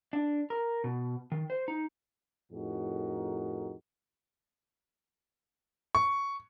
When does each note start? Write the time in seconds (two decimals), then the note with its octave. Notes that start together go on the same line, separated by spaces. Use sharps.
0.13 D4
0.50 A#4
0.84 B2
1.32 D#3
1.50 C5
1.68 D#4
2.52 F2 A2 D#4 F#4 G#4 A#4
5.95 C#6